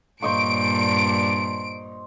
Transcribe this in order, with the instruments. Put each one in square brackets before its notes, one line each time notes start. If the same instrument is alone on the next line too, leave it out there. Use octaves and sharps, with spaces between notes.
[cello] G2 A#2 [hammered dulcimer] C5 D#5 C#6 [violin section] D7